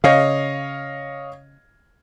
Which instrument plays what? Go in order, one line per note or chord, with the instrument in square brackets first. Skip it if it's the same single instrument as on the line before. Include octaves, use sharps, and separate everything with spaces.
[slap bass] C#3 [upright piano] C#5 D#5 F5